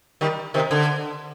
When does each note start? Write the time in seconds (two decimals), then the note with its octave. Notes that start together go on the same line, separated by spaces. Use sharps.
0.21 D#3 G3
0.54 C3 D#3
0.71 D3